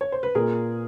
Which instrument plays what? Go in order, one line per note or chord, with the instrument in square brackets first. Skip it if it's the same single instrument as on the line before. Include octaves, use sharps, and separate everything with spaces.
[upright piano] C#5
C5
B4
[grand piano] A#2 [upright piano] G#4 A#4